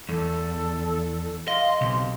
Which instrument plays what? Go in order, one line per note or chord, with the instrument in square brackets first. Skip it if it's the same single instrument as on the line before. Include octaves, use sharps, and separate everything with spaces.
[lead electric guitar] E2 [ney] A4
[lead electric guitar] D#5 [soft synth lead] F5 [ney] C6
[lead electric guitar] B1 [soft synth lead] C3